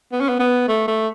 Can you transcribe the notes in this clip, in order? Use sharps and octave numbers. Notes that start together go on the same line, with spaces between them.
B3
C#4
B3
B3
A3
A3